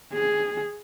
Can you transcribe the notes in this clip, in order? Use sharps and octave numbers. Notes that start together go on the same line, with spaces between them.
G#4